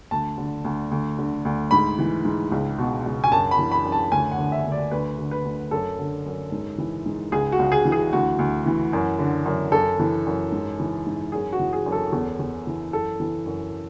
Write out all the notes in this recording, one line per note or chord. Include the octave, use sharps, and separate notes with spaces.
D2 A5
D3
D2
D2
D3
D2
G#2 B5
E3
G#2
C#2
B2
C#2
G#5
F#2 A5
B5
E3
B5
F#2
A5
D2 G#5
F#5
D3
E5
D2
D5
D2 B4
D3
B4
D2
F#2 A4
D3
F#2
G#2
E3
G#2
C#2 G#4
F#4
C#2
G#4
E3
G#4
D2 F#4
D2
E3
F#2
D3
F#2
F#2 A4
E3
F#2
G#2
E3
G#2
F#2 G#4
F#4
E3
G#4
F#2
A4
E2
E2
E3
F#2 A4
E3
F#2